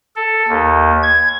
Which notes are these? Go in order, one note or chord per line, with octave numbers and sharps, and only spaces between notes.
A4
D#2
G#6